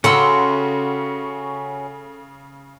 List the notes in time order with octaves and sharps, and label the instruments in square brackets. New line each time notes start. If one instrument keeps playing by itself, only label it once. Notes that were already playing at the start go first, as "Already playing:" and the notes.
[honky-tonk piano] C#3 [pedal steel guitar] C#4 F#4 [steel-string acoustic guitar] A4 G5 [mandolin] F#5 C6 E6